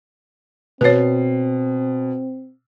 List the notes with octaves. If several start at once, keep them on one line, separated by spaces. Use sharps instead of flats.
B2 C4 B4 C#5 C7